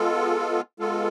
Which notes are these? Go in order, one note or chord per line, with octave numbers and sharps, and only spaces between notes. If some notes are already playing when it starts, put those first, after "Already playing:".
Already playing: G#3 B3 F4 A4
G#3 B3 F4 A4